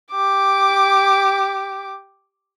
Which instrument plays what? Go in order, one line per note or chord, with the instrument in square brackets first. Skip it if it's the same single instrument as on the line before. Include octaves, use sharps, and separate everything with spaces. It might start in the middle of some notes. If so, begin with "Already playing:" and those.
[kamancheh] G4 D6